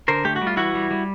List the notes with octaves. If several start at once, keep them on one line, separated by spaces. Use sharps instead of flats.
D3 A#4 C5
A3 G4
F#4
G3
F4
E3 E4 F#4
G3
G3